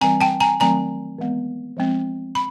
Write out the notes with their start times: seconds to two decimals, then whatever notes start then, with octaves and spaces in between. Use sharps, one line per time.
0.01 E3 G3 C4 G#5 A#5
0.21 G5 A5
0.40 G#5 A#5
0.60 D#3 F#3 A3 C4 G#5 A#5
1.18 E3 G#3 B3
1.77 F3 G#3 C4
2.35 B5